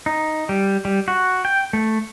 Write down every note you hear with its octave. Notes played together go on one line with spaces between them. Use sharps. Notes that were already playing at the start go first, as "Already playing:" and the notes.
D#4
G3
G3
F#4
G5
A3